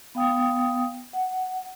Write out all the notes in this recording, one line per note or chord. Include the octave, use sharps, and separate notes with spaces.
B3 F5 G5 D#6
F#5